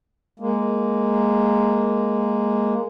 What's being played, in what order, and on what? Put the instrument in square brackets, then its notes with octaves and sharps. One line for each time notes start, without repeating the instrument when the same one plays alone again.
[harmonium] G#3 A#3